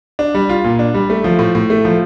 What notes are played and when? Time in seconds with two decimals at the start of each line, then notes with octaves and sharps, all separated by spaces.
0.19 D4
0.35 G3
0.49 F4
0.64 A#2
0.79 D4
0.94 G3
1.10 A3
1.24 F3
1.39 A2
1.55 A2
1.70 A3
1.85 F3